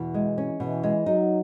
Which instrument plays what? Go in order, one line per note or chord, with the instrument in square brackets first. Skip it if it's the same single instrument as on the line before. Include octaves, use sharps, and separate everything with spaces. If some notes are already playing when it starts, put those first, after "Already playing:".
Already playing: [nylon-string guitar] E2 B2 [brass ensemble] E3
[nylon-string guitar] G#3
C#4
[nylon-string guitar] B2 [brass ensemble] E3
[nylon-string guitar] G#3
[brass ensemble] F#3 [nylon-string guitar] D#4